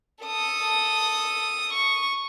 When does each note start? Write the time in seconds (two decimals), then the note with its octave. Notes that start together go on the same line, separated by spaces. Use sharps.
0.23 A4 D#6
1.73 C#6